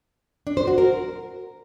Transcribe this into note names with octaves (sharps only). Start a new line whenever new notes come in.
D4
C5
F#4
A#4